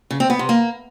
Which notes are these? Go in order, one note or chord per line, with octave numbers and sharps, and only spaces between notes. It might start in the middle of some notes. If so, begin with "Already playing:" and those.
C#3
C4
B3
C3
A#3